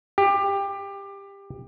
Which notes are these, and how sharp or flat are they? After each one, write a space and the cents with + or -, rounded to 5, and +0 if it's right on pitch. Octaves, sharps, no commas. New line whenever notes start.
G4 +20